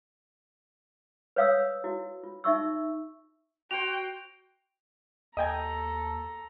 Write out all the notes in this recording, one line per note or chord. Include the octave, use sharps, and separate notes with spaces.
B4 C#5 F5 D#6 E6
E4 F#4
F4
D#4 E5 C#6 E6
F#4 C5 G5 F7
D#2 A4 D#5 G5 G#5 A#5